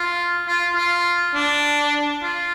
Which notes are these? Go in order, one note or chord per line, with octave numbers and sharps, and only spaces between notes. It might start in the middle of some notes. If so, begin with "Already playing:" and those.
Already playing: F4
F4
F4
D4
F4